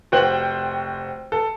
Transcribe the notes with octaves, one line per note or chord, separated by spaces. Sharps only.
F1 F#4 C5 G5 F#7
A4